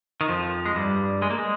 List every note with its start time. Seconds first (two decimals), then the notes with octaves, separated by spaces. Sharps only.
0.21 D#3
0.28 F2 F3
0.66 G#3
0.76 G2 G3
1.22 G#3
1.30 A#3
1.38 G#3